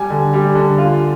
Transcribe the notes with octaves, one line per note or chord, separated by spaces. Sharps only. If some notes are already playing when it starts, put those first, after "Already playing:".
Already playing: G3 G#5
D3
G3
D3
F4